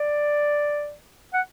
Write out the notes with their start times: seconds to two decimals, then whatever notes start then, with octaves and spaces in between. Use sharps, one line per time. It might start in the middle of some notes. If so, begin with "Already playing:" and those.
Already playing: D5
1.33 F#5